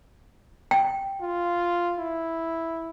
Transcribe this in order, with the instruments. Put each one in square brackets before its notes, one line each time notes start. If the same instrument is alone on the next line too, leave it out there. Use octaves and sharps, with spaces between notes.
[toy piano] G5
[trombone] F4
E4